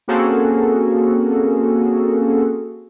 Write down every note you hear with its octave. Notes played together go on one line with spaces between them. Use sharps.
A#3 C4 C#4 F#4 G#4 A4